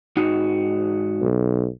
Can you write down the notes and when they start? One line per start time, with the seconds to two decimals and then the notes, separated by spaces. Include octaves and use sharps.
0.17 G#2 D#4 F#4
1.21 B1